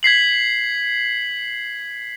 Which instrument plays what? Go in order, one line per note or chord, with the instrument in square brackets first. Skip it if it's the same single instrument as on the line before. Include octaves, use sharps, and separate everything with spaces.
[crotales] G#6 B6 C7 F#7